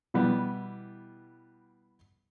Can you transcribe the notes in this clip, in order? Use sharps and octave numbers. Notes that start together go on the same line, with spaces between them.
B2 E3 G3 B3